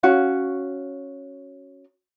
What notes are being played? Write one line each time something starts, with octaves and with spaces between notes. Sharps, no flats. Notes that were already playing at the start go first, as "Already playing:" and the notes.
C#4 F#4 F5